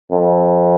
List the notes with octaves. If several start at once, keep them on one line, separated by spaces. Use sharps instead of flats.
F2